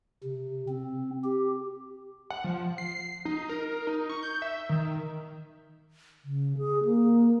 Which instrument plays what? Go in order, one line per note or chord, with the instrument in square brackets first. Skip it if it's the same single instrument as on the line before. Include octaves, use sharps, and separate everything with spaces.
[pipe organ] C3
C4
G4
[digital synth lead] F#5
F3
C7
D#4
A#4
D#4
C#6
G6
E5
D#3
[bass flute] C#3
G#4
A#3